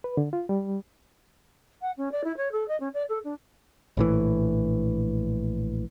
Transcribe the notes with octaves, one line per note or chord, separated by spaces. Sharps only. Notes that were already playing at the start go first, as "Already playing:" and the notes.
B4
D3
F4
G3
F#5
C#4
D5
E4
C#5
A4
D#5
C#4
D5
A4
D4
A#1 A2 E3